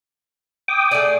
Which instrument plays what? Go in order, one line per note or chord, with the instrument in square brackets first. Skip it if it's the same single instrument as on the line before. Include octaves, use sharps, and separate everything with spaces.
[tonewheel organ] G5 D6 D#6
[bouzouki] A3 G#4 D5